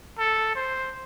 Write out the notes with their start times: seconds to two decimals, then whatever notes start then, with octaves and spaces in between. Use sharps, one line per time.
0.19 A4
0.56 C5